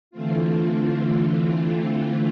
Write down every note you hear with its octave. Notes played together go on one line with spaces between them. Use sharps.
D3 E3 A3 C4 F4